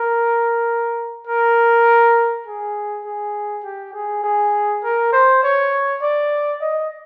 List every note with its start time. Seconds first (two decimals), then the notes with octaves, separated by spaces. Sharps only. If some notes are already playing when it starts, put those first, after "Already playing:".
Already playing: A#4
1.27 A#4
2.47 G#4
3.05 G#4
3.64 G4
3.94 G#4
4.24 G#4
4.84 A#4
5.13 C5
5.43 C#5
6.02 D5
6.61 D#5